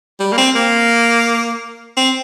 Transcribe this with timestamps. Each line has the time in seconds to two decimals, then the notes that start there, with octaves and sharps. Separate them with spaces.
0.20 G3
0.32 A#3
0.38 C4
0.55 A#3
1.97 C4